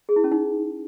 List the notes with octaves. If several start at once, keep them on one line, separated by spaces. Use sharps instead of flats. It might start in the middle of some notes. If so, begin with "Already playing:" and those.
G#4
E4
C#4
D#4